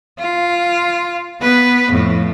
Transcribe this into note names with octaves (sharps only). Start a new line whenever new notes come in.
F4
B3 B4
F2 A2